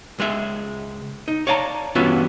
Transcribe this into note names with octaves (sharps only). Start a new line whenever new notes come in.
C#2 G#3 G#4 E5
D#4
C#5 D5 F5 A5 A#5
G2 E3 B3 C#4 F4 F#4